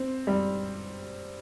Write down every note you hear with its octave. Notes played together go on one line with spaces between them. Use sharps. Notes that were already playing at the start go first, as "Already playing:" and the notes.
Already playing: C4
G3